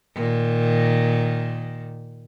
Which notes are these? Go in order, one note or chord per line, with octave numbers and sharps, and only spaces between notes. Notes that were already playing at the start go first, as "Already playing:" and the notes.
A#2 D#3